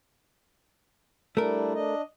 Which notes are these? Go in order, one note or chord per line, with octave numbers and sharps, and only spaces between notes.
G3 A3 D4 E4 A#4
D4 D#5